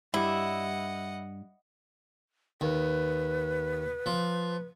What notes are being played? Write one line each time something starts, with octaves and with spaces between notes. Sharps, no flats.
G2 G3 E4 D#5 F#5
D#2 B4
F3